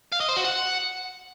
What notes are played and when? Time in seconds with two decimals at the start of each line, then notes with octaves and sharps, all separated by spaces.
0.12 F5
0.20 D#5
0.28 C5
0.36 F#4
0.45 F#5